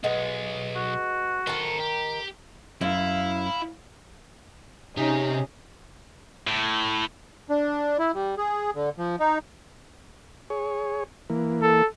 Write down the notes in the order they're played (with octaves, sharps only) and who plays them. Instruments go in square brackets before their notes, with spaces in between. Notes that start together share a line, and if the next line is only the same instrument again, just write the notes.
[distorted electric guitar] B1 [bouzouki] G#3 B3
[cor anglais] F#4
[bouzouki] D#3 A#4 [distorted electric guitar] A4 C5
[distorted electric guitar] G4
[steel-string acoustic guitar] F#2 [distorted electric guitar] E4 [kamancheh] F5
[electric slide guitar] C3 G4 [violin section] C#4 D#4 G#4
[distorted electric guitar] A2
[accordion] D4
E4
G3
G#4
D3
F3
D#4
[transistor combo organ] G#4 C#5
E3 A#3
[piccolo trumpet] A4